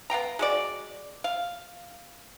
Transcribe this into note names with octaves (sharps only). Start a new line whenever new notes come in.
B3 F5 G5 A#5
G#3 F#4 D5
F5